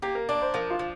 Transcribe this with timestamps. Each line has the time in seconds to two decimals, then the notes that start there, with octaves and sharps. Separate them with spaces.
0.02 A#3 G4
0.15 A#4
0.29 D4 D5
0.42 C5
0.54 F3 A#4
0.70 F4
0.79 F3